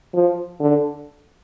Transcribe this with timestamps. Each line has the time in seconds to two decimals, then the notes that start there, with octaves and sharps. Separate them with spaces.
0.14 F3
0.60 D3